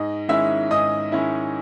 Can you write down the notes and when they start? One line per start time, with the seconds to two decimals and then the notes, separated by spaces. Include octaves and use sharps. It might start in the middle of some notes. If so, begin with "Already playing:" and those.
Already playing: G#2 D#5
0.28 D#3 G#3 C#4 E4 E5
0.71 G#2 D#5 D#6
1.12 D#3 G#3 C#4 E4